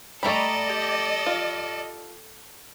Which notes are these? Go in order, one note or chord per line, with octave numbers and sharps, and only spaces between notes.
G3 A3 A4 D5 D#5 A#5 B5
G4
F4